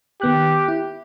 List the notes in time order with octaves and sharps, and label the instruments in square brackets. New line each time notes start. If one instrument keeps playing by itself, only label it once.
[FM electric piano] D#3 B3 F#6 [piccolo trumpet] G4
[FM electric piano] E4